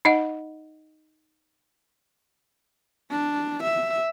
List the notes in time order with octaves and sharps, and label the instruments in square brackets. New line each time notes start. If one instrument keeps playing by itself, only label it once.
[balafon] D#4 D#5 F#5
[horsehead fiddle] D4
E5